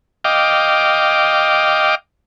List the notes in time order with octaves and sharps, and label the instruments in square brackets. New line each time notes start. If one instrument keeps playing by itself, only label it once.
[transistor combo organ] D#5 F5 G5 D6